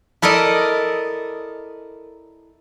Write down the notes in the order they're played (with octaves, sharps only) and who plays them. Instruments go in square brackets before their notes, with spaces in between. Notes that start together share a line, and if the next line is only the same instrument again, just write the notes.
[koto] E4 A4 A#4 D5 D#5